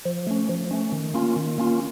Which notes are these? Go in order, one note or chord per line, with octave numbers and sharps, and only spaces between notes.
F3
A3 C#4
F3
A3 C#4
D#3
A#3 C#4 F4
D#3
A#3 C#4 F4